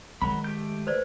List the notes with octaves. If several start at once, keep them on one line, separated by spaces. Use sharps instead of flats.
D#3 F#3 G#3 B5
A3 G4 G6
B4 C5 D5